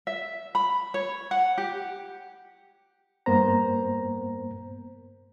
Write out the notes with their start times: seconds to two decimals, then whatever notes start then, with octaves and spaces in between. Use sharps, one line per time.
0.07 E5
0.55 B5
0.94 C#5
1.31 F#5
1.58 G4
3.26 G2 A#3 B3 A#4 C5 A#5